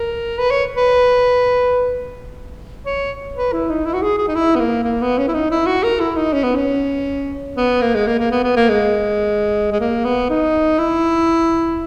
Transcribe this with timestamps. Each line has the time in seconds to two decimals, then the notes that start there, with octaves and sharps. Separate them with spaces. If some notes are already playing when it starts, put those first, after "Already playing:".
Already playing: A#4
0.39 B4
0.51 C#5
0.76 B4
2.86 C#5
3.36 B4
3.53 E4
3.69 D#4
3.85 E4
3.94 F#4
4.02 G#4
4.18 G#4
4.28 D#4
4.35 E4
4.55 B3
4.60 A#3
4.84 A#3
5.02 B3
5.18 C#4
5.28 E4
5.34 D#4
5.51 E4
5.67 F#4
5.84 A#4
6.00 E4
6.16 D#4
6.33 C#4
6.44 B3
6.55 C#4
7.57 B3
7.82 A#3
7.95 G#3
8.07 A#3
8.19 A#3
8.32 B3
8.44 B3
8.57 A#3
8.69 G#3
9.72 G#3
9.80 A#3
10.05 B3
10.30 D#4
10.79 E4